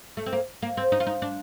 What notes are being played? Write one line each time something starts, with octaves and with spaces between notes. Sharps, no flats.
A3
C4
A#3
A#3
C4
D#4
F4
D#4
D4